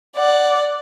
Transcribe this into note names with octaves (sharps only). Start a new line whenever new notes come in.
D5 F#5